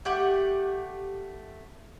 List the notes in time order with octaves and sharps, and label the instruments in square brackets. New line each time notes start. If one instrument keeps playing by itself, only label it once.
[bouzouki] A3 G4 F#5